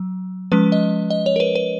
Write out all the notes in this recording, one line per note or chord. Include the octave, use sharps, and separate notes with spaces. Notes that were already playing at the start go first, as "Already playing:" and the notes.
Already playing: F#3
F3 G#3 C#4 B4
D#5
D#5
C#5
A#4
B4
B4